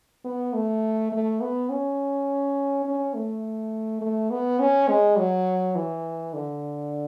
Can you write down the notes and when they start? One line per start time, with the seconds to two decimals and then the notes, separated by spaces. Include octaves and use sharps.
0.25 B3
0.53 A3
1.12 A3
1.41 B3
1.70 C#4
2.85 C#4
3.14 A3
4.01 A3
4.31 B3
4.60 C#4
4.89 G#3
5.18 F#3
5.76 E3
6.34 D3